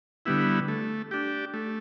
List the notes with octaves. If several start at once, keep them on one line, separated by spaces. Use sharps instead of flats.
D3 G3 B3 E4
A3
D4 G4
A3